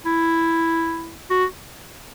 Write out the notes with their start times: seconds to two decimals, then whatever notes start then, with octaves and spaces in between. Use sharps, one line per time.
0.06 E4
1.31 F#4